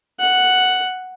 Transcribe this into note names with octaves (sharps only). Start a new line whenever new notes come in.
F#5